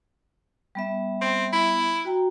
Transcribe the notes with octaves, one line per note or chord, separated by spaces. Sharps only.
G3 B3 E5
C4
E4
F#4 G5 A#5